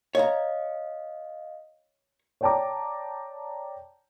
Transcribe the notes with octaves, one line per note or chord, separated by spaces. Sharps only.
C#5 D#5 F5 A#5
C#5 D5 G5 A5 A#5 D6